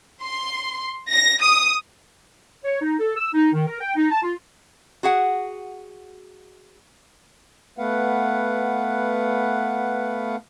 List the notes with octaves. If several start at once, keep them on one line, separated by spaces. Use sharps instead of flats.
C6
A#6
D#6
C#5
D#4
A4
E6
D#4
D#3
A#4
G5
D#4
A5
F4
F#4 G#4 F#5
A3 B3 B4 F5 F#5